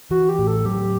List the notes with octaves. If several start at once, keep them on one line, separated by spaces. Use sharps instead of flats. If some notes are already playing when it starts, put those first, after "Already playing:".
E3 F#4
G4
A2
A4
F#3 G4